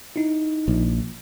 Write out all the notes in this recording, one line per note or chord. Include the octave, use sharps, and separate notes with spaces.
D#4 E4
A#1